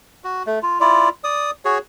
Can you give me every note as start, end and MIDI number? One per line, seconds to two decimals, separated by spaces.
0.24 0.43 66
0.46 0.59 57
0.63 0.78 65
0.80 1.09 64
0.80 1.09 65
0.80 1.09 74
1.24 1.51 74
1.24 1.51 87
1.65 1.78 66
1.65 1.78 68
1.65 1.78 73